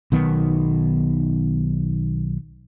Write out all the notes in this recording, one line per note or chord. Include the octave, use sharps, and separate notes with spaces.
B1 D#3 B3